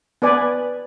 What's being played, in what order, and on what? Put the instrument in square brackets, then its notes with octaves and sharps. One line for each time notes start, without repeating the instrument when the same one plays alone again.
[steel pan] B3 B4 D5 G#5